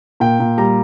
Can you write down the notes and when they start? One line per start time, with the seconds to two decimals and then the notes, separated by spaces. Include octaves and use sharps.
0.20 A#2 G5
0.40 A#2
0.58 G3 A#5